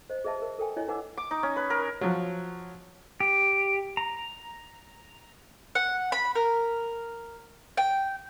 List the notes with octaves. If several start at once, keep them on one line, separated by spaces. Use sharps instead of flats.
C5 D#5
G#4 B4 D#5 E5 A5
A#4
A4 A#4 G5 G#5
E4 C#5 D#5 G#5
D#4 B4 F#5 G#5 D6 E6
D6
D#4
C#4
B4
A#4
F3 F#3
G4
A#5
F#5
B5
A#4
G5